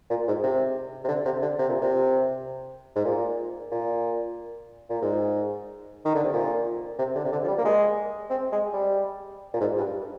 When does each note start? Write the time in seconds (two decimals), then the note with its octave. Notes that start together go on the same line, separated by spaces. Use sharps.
0.10 A#2
0.27 G#2
0.43 C3
1.04 C3
1.08 D3
1.25 C3
1.42 D3
1.58 C3
1.69 A#2
1.81 C3
2.95 G#2
3.05 A#2
3.72 A#2
4.90 A#2
5.02 G#2
6.05 D#3
6.15 D3
6.24 C3
6.33 A#2
6.98 C3
7.16 D3
7.25 C3
7.32 D3
7.44 F3
7.48 G3
7.58 A#3
7.65 G#3
8.30 C4
8.52 G#3
8.73 G3
9.54 A#2
9.61 G#2
9.78 G2